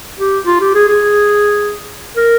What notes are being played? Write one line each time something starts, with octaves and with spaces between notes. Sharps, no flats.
G4
F4
G4
G#4
G#4
A#4